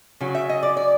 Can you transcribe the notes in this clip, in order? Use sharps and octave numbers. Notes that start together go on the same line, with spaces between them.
C#3 F#3
E5
D#5
D5
D5